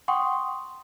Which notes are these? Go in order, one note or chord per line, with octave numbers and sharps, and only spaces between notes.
F#5 G5 C6 C#6 D#6